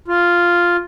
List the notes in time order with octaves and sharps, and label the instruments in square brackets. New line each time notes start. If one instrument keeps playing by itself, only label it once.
[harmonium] F4